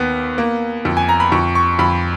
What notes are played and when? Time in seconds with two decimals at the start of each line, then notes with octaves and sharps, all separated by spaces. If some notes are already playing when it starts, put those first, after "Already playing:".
Already playing: D#2 B3
0.38 A#3
0.85 F2
0.97 G#5
1.09 A#5
1.20 B5
1.32 F2 C#6
1.55 C#6
1.79 F2 B5